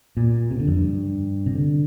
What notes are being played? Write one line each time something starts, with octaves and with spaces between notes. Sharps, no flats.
A#2
C3
D3
F2
G2
C3
D3